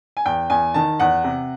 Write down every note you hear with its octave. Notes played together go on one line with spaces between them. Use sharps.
G#5
E2 G5
E2 G#5
D#3 A5
E2 F#5
C3